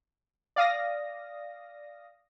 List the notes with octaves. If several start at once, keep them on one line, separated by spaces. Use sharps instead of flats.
D5 F5 D#6 A#6